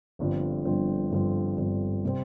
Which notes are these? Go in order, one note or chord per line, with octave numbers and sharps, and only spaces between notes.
G1 G2 D3 F3 C4
G1 G2 D3 F3 C4
G1 G2 D3 F3 C4
G1 G2 D3 F3 C4
C3 G3 C4